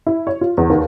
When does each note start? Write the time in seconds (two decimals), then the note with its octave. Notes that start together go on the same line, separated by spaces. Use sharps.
0.07 E4
0.27 C#5
0.41 F4
0.57 E2
0.70 D#2